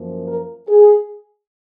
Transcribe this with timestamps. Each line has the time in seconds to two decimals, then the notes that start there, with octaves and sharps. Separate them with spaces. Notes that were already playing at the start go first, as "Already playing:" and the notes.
Already playing: F#2 F3 A#3
0.26 A#4
0.68 G#4